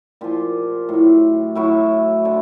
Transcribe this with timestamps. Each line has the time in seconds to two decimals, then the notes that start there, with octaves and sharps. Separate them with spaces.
0.21 A#2 F3 F4 G4
0.89 A2 F#3
1.55 A2 F#3 E4 F#4
2.25 D3